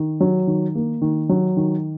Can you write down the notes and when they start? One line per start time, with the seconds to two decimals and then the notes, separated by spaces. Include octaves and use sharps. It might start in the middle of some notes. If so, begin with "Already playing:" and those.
Already playing: D#3
0.20 F#3
0.47 D#3
0.75 A#3
1.02 D#3
1.29 F#3
1.57 D#3